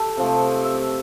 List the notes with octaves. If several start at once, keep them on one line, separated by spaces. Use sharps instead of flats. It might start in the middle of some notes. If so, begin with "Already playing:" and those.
Already playing: G4 A4
C3 F3 A3
E5
E5